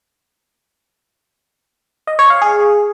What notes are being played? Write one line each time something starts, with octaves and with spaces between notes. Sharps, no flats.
D#5
C#5
F5
G#4